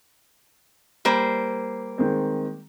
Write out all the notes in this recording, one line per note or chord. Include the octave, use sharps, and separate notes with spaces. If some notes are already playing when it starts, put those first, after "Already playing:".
G3 A#3 C5
D#3 G#3 C4